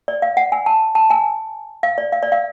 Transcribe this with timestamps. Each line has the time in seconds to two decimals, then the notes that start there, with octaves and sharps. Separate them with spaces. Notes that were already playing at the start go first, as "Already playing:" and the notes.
0.08 D5
0.22 F5
0.37 F#5
0.52 G#5
0.66 A5
0.95 A5
1.10 G#5
1.83 F5
1.98 D5
2.12 F5
2.23 D5
2.32 F5